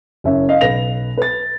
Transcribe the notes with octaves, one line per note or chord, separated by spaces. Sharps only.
F#1 C#4 E5
D#5 F5
B1 B4 A#6 F7
B4 A6